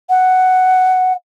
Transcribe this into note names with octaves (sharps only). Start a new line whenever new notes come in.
F#5